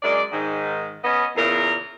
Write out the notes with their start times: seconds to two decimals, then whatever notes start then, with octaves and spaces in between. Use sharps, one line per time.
0.03 F#2 G#3 D5
0.32 G#2 D#3
1.03 B3 C#4 D#5
1.36 E2 A#2 C#3 A#4